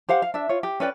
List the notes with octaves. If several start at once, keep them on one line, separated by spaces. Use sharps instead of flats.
G4 C5 F5 F#5
F5
D4 E5
F4 C#5
G4
C#4 B4 D5 G5